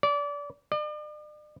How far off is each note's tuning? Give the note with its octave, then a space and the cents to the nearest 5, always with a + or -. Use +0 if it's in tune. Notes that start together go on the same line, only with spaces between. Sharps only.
D5 -30
D5 +40